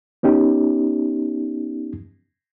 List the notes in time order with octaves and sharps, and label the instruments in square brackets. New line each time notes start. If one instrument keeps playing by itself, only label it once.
[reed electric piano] B3 C#4 D#4 G4